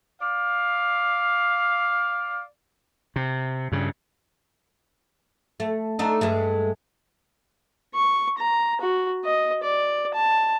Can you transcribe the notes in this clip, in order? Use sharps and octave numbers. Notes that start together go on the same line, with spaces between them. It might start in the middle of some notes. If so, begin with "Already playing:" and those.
D5 F5
C3
G2 C#3
A3
A3 D4 D#4
G2 G#3 A3
C#6
A#5
F#4
D#5
D5
A5